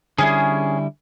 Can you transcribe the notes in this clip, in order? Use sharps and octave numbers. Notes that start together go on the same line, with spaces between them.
D3 G3 C#4 E4 G#4